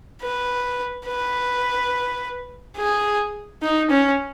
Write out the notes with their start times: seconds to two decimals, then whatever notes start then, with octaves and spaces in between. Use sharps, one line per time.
0.22 B4
1.07 B4
2.77 G#4
3.63 D#4
3.90 C#4